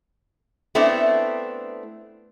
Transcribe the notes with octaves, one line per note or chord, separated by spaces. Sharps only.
A3 B3 C4 D4 E4